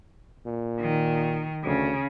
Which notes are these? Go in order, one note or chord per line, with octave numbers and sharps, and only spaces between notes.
A#2
D#3
D2 C#3